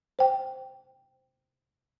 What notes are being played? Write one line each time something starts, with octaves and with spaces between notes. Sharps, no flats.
C5 G5